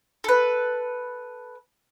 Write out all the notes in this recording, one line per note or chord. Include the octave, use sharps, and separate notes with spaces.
A4 B4